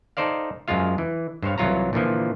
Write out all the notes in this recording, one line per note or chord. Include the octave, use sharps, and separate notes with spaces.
D#4 A4 C5 D5 F5
F#2 F3 G#3 F4 F5
E3
G2 C5 C#5 F5
C2 E3 F#3 F4 C#5 A#5
A#2 D3 E3 F3